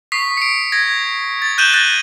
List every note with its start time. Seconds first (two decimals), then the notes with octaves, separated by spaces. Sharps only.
0.12 C#6 D#6 B6 C7
0.37 C#7 D7
0.72 G#6 A#6
1.42 A6
1.58 F#6 G6 D#7 E7 F#7 G7
1.74 F#6 G6 A6 A#6